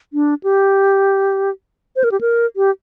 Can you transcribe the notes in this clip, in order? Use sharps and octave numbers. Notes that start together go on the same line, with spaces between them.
D4
G4
C5
A#4
G4
A#4
G4